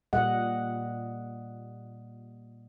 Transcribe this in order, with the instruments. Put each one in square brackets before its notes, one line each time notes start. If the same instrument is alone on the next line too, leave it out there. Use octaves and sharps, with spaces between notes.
[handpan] A#2 G3 D#5 F#5